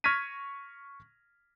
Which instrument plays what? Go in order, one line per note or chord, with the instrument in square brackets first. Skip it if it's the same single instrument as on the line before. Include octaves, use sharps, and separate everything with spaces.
[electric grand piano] C#6 F6 G#6 A#6 B6 D#7